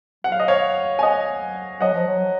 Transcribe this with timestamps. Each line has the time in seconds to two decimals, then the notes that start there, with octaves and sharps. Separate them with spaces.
0.24 F#3 F#5
0.32 F5
0.40 D#5
0.48 C#5 F5
0.99 G#5
1.03 D#5 F#5
1.81 F#3 D#5 F#5
1.94 F3
2.07 F#3